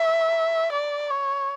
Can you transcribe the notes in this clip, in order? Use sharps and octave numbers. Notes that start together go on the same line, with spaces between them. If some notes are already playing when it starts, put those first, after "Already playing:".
Already playing: E5
D5
C#5